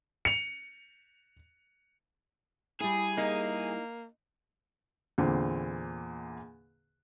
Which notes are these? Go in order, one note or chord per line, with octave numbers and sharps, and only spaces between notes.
C#7 F7
G3 E4 G#4
A#3 D#4
E2 A#2 D3 C4